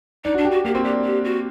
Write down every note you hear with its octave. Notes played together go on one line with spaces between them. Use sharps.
D4 D#4
F#4
D4
G4
F#4
A#3 G4
C4 F#4
D4 G4
G4
F#4